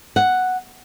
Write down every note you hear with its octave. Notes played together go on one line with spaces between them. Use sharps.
F#5